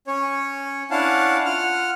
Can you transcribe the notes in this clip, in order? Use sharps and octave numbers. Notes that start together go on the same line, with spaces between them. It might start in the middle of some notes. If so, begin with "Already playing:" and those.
C#4 C#5
C#4 D4 E4 F5 F#5 A5
F4 F#5 F6